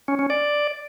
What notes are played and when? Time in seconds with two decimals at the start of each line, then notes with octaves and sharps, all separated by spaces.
0.08 C#4
0.19 C#4
0.30 D5